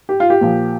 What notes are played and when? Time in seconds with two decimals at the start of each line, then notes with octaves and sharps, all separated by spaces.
0.09 G4
0.20 F4
0.30 G4
0.41 A#2 F3